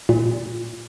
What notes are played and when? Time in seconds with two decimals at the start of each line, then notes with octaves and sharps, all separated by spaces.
0.09 A#2